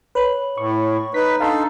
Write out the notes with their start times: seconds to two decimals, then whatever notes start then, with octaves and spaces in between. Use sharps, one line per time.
0.15 B4 C#5 B5 F#7
0.58 A2 C#6
1.14 D#4 B4 B6
1.40 D4 D#4 A4 F5 A5 A#5 C6